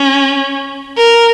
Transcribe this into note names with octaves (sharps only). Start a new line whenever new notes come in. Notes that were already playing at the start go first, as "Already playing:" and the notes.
Already playing: C#4
A#4